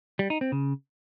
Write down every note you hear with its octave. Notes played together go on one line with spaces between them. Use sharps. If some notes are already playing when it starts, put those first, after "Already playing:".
G3
D#4
C4
C#3